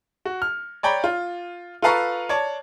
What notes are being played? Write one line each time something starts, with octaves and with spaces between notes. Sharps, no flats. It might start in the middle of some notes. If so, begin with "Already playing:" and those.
F#4
F6
C#5 D5 G5 A#5 B5
F4
F4 A4 B4 F5 A#5 C#6
C#5 D5 A5